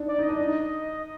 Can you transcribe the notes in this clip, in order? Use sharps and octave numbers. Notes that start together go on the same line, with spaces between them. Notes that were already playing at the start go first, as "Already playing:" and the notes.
Already playing: D4 D#4
D5
D#4 D#5
D4
D#4